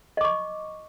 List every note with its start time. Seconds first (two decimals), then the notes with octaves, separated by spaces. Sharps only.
0.17 D#5
0.21 D6
0.24 C#6